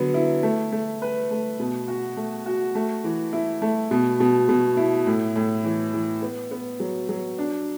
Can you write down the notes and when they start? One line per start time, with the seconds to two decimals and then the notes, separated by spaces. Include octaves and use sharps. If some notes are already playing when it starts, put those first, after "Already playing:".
Already playing: D3 F#3 B3
0.14 E4
0.43 A3
0.72 A3
1.02 B4
1.31 A3
1.60 B2
1.88 F#4
2.17 A3
2.46 F#4
2.75 A3
3.04 E3
3.33 E4
3.62 A3
3.91 B2
4.20 B2
4.49 B2
4.77 E4
5.06 A2
5.35 A2
5.64 E3
5.93 E3
6.22 B3
6.51 B3
6.80 F#3
7.09 F#3
7.38 D4